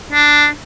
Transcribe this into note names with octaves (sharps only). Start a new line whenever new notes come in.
D4